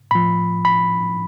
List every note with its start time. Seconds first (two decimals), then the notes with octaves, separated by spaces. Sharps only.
0.11 A2 F3 B5
0.65 B5